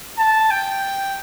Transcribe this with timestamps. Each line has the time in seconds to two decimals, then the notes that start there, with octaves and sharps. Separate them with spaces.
0.18 A5
0.51 G5